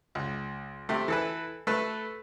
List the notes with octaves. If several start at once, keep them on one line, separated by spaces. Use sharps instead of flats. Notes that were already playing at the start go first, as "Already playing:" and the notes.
C#2
C3 A3
E3 A4 B4
A3 A4 B4